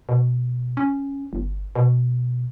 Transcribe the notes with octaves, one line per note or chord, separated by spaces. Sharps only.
B2
C#4
G1
B2